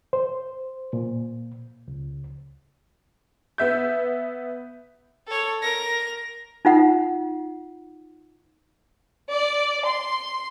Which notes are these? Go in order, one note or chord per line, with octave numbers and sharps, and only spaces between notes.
C5
A#2
C#2
B3 E5 G6
A4 C#5
A#4 A#6
D#4 F4 F#5
D5
C6